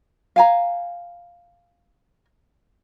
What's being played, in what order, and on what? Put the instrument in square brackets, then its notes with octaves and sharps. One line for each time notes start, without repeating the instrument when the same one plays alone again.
[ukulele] F5 G#5 A#5